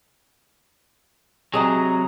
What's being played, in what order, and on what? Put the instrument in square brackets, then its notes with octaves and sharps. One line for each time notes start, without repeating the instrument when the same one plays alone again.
[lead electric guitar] C3 F#3 [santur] G#4 D#5 A#5